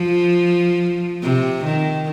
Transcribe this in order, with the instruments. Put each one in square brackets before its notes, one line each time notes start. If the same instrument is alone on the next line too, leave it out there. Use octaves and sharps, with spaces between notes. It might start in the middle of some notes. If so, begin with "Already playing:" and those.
Already playing: [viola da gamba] F3
C3
D#3